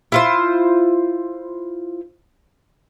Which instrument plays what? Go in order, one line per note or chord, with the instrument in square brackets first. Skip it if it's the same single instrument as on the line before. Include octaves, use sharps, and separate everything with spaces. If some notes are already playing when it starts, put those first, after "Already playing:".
[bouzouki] E4 F4 C5